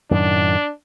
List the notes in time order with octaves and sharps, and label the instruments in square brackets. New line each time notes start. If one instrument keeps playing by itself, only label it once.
[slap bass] F#2 A2 D#3 [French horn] D4